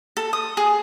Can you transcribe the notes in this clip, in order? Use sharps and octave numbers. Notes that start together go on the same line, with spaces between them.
A4
D#6
G#4